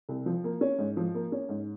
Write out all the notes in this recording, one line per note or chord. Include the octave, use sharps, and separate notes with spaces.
C2
F3
A#3
C#4
G#2
F3
A#3
C#4
G#2